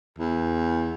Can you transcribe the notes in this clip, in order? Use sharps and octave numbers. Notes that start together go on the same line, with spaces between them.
E2